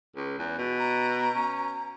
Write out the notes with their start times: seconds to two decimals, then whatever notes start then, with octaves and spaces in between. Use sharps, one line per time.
0.16 C#2
0.39 E2
0.58 B2
0.79 A#5
1.35 C#4